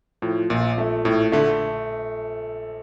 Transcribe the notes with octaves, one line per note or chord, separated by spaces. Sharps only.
A2 F3
A#1 A#2
A3
A2 A3
D3 A3